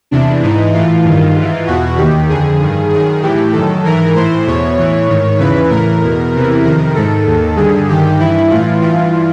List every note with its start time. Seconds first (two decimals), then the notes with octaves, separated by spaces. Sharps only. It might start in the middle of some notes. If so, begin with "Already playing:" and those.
0.11 E2 C3 E3 D4
0.43 G#2 E3 D#4
0.74 A2 E3 F4
1.04 G2 D#3
1.35 G#2
1.41 E3
1.67 E2 B2 F#4
1.97 D#2 D#3 G4
2.29 F2 D3 G#4
2.61 G2 D#3
2.91 F#2 D#3 G#4
3.22 A2 E3 G4
3.53 F#2 D#3 A4
3.84 G#2 E3 A#4
4.15 A2 E3 C5
4.46 E2 B2 C#5
4.78 A2 E3
5.08 G#2 D#3
5.39 E2 C#3 E3 B4
5.70 A2 E3 A#4
6.02 E2 B2
6.32 E2 C3 E3
6.63 F2 C3 D#3 A#4
6.94 G#2 D#3 A4
7.26 D#2 D#3
7.56 G2 D3 G#4
7.88 G2 D#3 G4
8.19 G2 E3 E4
8.50 A2 E3 F4
8.81 G2 E3 F4